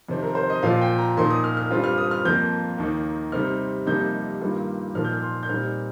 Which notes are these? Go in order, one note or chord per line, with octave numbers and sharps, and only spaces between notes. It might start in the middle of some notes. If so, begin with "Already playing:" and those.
F2 C3 D#3 C4
A#4
C5
D#5
A#2 F3 C4 F4 F5
G5
A#5
A#2 F3 D#4 C6
D#6
F6
F6
G2 G3 C4 F4
F6
D#6
F6
F2 F3 A#3 G6
D#2 D#3 A#3 D#4
C3 G3 C4 D#4 F6
F2 C3 G3 A#3 D#4 G6
G2 D#3 G3 A#3 F4
A#2 F3 A#3 D#4 F6
G6
F6
C6
G6
A#2 G3 C4 D#4 F6